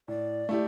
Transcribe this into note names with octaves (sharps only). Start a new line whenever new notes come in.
A2 D5
A3 E4 G4